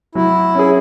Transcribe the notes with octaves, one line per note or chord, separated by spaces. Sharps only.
F#3 E4
C#4 G#4